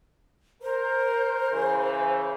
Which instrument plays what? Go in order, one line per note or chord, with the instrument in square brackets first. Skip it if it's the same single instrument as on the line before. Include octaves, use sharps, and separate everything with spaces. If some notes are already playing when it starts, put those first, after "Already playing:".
[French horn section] A#4 [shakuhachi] C5
[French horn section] C#3 E3